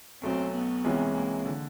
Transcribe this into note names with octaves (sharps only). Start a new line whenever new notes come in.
B1 B2 F#3 A3 C4 C#4
B3
C2 C3 E3 G#3 C#4
A#3
D3